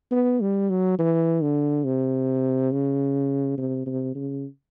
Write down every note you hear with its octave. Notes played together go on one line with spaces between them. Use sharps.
B3
G3
F#3
E3
D3
C3
C#3
C3
C3
C#3